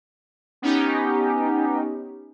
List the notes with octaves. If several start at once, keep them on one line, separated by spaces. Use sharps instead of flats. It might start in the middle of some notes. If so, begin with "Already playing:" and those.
B3 C#4 D#4 G4